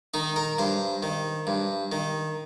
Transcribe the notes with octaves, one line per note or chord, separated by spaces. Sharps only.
D#3 D#4
A#4
G2 C5
D#3
G2
D#3